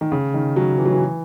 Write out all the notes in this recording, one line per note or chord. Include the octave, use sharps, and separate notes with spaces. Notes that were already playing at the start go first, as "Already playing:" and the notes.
D#3
C#3
D#3
F#3
E3
F#3
E3